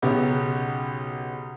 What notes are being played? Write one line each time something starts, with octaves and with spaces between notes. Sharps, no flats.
B1 C#3 B3 G4